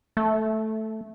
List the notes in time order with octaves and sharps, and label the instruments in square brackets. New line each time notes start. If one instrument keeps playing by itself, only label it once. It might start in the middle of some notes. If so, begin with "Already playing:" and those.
[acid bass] A3